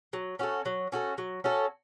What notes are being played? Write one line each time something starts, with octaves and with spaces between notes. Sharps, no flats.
F#3
C#4 F#4 A4
F#3
C#4 F#4 A4
F#3
C#4 F#4 A4